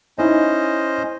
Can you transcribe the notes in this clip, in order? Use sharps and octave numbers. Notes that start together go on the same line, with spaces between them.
C#4 D#4 E4 C5 D#5